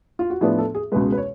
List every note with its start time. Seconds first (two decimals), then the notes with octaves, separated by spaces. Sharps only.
0.19 F4
0.30 F#4
0.41 A2 F3 B3 D4 G#4
0.58 A4
0.75 G#4
0.92 C#2 B2 G#3 B4
1.12 B4
1.17 C#5